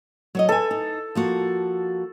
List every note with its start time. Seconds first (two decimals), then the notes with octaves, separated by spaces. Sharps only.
0.35 F#3 C#5 D#5
0.49 A4 B4 G#5
0.71 D#4
1.15 F3 A#3 F#4